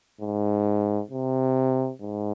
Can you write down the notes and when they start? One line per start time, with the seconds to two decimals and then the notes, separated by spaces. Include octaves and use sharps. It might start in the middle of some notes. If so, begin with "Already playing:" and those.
0.21 G#2
1.11 C3
2.01 G#2